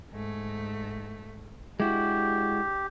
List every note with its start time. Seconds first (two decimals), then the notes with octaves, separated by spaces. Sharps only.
0.12 G#2 A3
1.80 G#3 D4 E4 F#4 G4